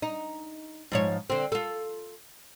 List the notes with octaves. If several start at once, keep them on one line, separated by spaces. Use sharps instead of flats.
D#4
G#2 F3 C#5
D3 C4
F4 A4